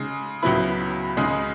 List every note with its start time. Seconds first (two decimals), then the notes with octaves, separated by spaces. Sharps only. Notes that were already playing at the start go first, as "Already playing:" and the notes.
Already playing: C#3 G#3 D#4
0.42 C#2 C#3 F#3 B3 E4 B5
1.17 C#2 C#3 G#3 D#4